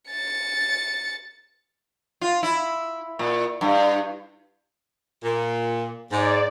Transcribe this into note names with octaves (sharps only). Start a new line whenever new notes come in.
A6 C#7
F4
E4
A#2
G2
A#2
G#2 D5